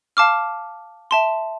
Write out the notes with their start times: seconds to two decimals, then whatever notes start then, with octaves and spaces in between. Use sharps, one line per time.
0.17 F5 A5 D6 F6
1.11 E5 A5 C6